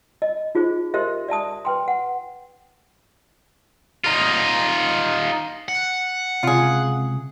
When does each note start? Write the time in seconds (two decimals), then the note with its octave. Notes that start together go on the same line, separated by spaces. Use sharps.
0.22 D#5
0.55 D#4 F4 G#4 C5
0.94 G4 A#4 C5 D#5 E5 C6
1.28 D5 E5 A5 D#6
1.65 B4 G5 C6
1.88 F#5
4.04 D#4 F4
5.68 F#5
6.43 C#2 C3 F4 G#4